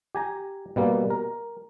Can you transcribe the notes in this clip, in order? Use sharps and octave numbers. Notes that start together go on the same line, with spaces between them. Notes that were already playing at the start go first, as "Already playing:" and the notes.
G4 G#5 A#5
B2 G3 A#3
A#4